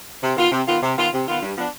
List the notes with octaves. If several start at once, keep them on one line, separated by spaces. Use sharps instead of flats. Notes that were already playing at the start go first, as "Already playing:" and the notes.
C3
D#3 B3 F4
C3
D#3 B3 F4
C3
D#3 B3 F4
C3
D#3 B3 F4
G2
F3 B3 D4